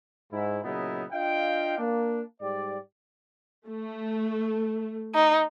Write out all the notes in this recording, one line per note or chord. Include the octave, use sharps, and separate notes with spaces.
G#2 E4
A#2 C#3 F#3 B3 D#4 E4
D4 F4 D#5 F5 G5
A#3 D4
G#2 G3 G4 D5
A3
D#4